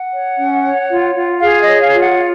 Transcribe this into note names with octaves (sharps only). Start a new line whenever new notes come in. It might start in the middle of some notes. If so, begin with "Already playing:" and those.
Already playing: F#5
C#5
C#4
C#5
F4
F4
G#4 F5
D#5
C#5
F5
F4
F#5